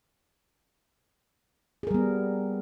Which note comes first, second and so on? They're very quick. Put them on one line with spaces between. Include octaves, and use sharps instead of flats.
G#4 A#4 G3 B3